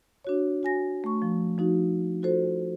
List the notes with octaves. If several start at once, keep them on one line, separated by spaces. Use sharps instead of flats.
D4 F#4 C#5
F#4 G#5 A#6
A3 C#6
F3
F3 D#4 F#4
F4 F#4 A4 C5